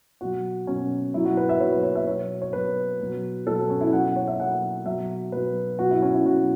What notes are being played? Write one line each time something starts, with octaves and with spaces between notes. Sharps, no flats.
B2 F#3 F#4
B2 F#3 C#4
B2 F#3 E4
F#4
B4
E5
B2 F#3 C#5
B4
C#5
E5
B2 F#3 C#5
C#5
B2 F#3 B4
B2 F#3
B2 F#3 A4
C#4
E4
B2 F#3 F#5
F#5
C#5
E5
B2 F#3 F#5
B2 F#3 E5
B2 F#3 B4
B2 F#3 F#4
E4
C#4
E4
B2 F#3 F#4